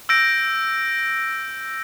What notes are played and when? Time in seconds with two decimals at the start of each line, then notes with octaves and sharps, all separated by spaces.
0.09 E6 G6 A#6 D7